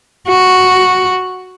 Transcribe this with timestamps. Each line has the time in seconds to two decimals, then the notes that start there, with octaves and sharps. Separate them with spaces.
0.28 F#4